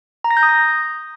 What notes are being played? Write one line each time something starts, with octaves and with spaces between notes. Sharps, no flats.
A#5
A#6
G6
D#6
A#6